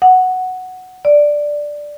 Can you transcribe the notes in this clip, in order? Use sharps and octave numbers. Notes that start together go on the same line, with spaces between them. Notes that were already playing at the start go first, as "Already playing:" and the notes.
F#5
D5